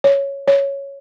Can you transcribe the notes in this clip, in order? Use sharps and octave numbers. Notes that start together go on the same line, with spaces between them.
C#5
C#5